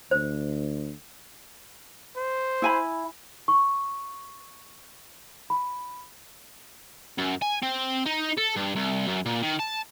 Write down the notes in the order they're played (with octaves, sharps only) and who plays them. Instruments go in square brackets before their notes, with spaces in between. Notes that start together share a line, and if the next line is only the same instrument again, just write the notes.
[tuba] D2 [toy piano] C5
[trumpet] C5
[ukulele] E4 G#5 B5
[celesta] C#6
B5
[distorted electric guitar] F#2
G#5
C4
D#4
A4
G2
C2
F#2
A#2
D#3
A5